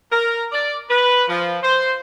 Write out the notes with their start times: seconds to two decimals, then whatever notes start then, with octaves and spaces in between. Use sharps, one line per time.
0.12 A#4
0.52 D5
0.89 B4
1.29 F3
1.63 C5